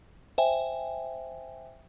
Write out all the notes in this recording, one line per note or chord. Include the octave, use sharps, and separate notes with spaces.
C5 E5 G5 G#5